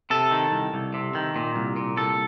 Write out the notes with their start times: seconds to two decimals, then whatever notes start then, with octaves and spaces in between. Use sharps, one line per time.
0.10 C3 A4
0.31 D#3
0.52 C2
0.74 C2
0.94 C3
1.15 D#3
1.36 A#2
1.56 C2
1.76 A#2
1.97 C2 A4